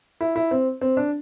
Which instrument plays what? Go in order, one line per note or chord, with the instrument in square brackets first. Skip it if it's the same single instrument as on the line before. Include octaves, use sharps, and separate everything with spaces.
[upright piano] E4
E4
C4
C4
D4